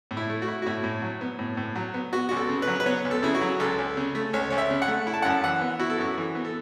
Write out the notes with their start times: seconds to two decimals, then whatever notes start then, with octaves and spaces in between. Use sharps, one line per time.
0.11 A2
0.17 E4
0.30 A3
0.42 F#4
0.48 E4
0.62 F#4
0.66 A2 E4
0.84 A2
1.02 F#3
1.21 B3
1.39 A2
1.57 A2
1.76 F#3
1.94 B3
2.13 B3 F#4
2.29 C#2 F#4
2.37 A4
2.49 C#3
2.62 B4
2.68 F#3
2.80 B4
2.86 B3 C#5
3.05 C#2
3.11 A4
3.23 C#3 E4
3.35 F#4
3.41 F#3
3.60 C#2 A4
3.78 C#2
3.97 C#3
4.15 A3
4.33 C#2 C#5
4.50 C#2 C#5
4.58 E5
4.70 C#3
4.82 F#5
4.88 A3
5.07 E4
5.14 A5
5.22 F#2 F#5
5.30 A5
5.44 E3 F#5
5.61 B3
5.79 E4 F#4
5.90 A4
5.98 F#2 F#4
6.17 E3
6.35 B3
6.45 A4